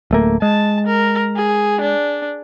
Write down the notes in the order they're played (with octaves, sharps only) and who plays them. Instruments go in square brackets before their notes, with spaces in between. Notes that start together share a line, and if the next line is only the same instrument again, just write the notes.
[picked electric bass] D1 A3 A#3
[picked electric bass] G#3 [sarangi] A5
[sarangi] A#4
G#4
D4